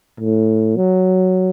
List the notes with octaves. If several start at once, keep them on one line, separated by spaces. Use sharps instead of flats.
A2
F#3